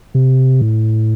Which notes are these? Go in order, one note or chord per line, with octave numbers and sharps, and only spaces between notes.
C3
A2